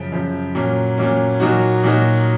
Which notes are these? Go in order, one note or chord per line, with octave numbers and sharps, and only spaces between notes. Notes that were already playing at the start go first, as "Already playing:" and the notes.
Already playing: F#2 C#3 F3
F#2 C#3 F3
A#2 F#3 A#3 C#4
A#2 F#3 A#3 C#4
A#2 F#3 A#3 D#4 F#4
A#2 F#3 A#3 D#4 F#4